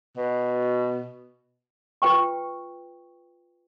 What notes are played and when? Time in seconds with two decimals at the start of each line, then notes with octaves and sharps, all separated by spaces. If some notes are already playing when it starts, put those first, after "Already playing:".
0.17 B2
2.02 F4 B4 G5 C#6